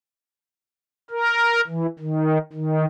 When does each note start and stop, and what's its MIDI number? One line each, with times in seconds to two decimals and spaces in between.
1.10 1.61 70
1.67 1.87 52
1.99 2.38 51
2.53 2.85 51